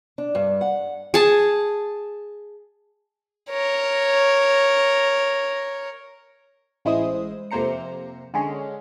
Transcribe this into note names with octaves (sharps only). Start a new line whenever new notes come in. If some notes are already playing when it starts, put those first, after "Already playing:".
D4
G2
F#5
G#4 A5
A#4 C#5
A1 G#3 E4 C5 D#6
F2 C3 A#3 C5 A#5 C#7
D3 G#3 C#4